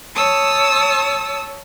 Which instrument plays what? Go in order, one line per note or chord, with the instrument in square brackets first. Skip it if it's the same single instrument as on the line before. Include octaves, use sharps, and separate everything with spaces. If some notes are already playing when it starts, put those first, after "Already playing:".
[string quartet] C#5 A5 D#6 E6